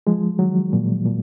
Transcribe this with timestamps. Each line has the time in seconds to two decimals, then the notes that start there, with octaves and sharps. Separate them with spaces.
0.07 F3 G#3
0.39 D#3 F#3
0.73 A#2
1.06 A#2